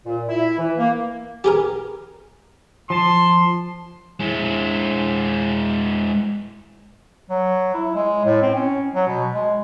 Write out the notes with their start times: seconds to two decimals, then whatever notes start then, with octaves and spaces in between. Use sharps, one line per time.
0.06 A#2
0.28 E4
0.58 E3
0.78 A#3
1.44 G4 G#4 A#4
2.90 F3 A5 C6
4.20 G#3 E4
7.30 F#3
7.74 E4
7.95 G#3
8.25 A2
8.42 C4
8.55 C#4
8.95 F#3
9.07 B2
9.33 G#3